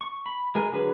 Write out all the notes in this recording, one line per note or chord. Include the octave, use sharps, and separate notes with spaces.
C#6
B5
G#3 A#4 G#5
D3 F#3 G#4 B4